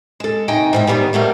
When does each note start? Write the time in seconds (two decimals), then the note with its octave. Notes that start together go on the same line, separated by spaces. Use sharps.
0.20 G#3 A4
0.48 D#2 C3 D#4 D#5 G5 G#5
0.73 G#2 E3 G5
0.87 G#2 C3 D#3 G3 B3
1.13 G3 A3 A#3 F#4